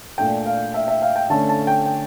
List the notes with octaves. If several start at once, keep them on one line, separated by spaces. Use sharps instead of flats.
A#2 A3 D4 G5
F5
E5
E5
F5
G5
D3 A3 C#4 A5
A5
G5
G5